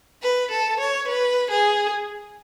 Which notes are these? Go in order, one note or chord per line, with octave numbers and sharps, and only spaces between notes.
B4
A4
C#5
B4
G#4